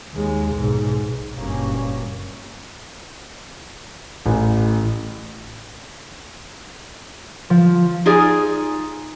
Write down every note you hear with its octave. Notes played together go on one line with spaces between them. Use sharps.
D#2 G#3
B1 G#2
F#1 G2 A#2 G3 A#3 C#4
A1
F3
D#4 F4 G#4 D5